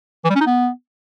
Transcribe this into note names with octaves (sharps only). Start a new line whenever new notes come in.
E3
G3
C#4
D#4
B3